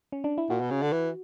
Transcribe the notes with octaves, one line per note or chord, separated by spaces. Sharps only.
C#4
D4
E4
A#2 F#4
B2
C#3
D3
E3